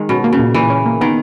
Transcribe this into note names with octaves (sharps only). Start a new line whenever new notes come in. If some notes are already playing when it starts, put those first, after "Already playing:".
Already playing: D#3 G#3
B2 C#4
A#3
C#3
A#2
A#2 E3
C#4
A#3
D#3 B3